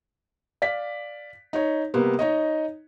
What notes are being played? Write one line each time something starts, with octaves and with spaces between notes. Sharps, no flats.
D5 F5 B6
D#4 C#5
C3 G3 A#3 B3
D#4 C#5 D#5